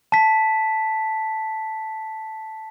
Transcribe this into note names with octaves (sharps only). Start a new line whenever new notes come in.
A5 B6